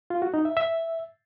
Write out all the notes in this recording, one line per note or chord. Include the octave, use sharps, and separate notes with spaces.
F4
F#4
D#4
E5
E5